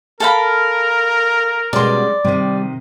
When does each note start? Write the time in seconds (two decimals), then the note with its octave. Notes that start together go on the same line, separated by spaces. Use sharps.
0.20 A4 A#4 F5 B5
1.73 B2 G3 G#3 C#4 D5 C6
2.25 C3 D#3 G3